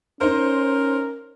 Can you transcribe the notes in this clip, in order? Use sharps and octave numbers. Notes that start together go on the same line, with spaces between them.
C#4 D#4 A#4 C5